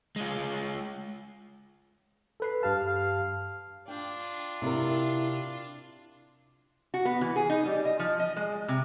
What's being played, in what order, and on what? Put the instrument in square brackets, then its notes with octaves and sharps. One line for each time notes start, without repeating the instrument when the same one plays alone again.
[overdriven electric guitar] G#3 F4
[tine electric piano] A4 B4 C7
[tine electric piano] G2 G4 A5 [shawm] F5
[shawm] F5
[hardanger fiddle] D4 F4 [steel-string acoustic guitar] G5
[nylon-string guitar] C3 A#4 [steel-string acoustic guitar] E4
[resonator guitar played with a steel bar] F#4
B3
E3
G#4
D#4
G3
D#5
F3
D#5
G#3
C3